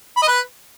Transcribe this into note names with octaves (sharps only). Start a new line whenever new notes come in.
B5
D#5
B4